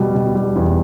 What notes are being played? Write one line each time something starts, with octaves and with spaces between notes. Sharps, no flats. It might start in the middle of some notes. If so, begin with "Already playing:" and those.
Already playing: B2 G3
B2
G3
E2